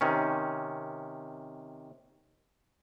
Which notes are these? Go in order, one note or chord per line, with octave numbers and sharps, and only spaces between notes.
C3 D#3 C#4